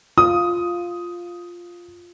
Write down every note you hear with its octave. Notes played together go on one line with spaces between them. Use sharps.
F4 D#6